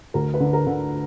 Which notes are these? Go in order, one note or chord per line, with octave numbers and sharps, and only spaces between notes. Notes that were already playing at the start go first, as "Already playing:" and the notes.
D2 A#4
B4
D3
A#4
D3